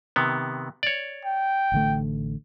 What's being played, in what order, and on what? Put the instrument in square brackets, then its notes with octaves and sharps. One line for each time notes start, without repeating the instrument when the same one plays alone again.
[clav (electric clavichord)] C3 D#3 B3
C#5 D5
[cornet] G5
[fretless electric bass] A1 D3 A3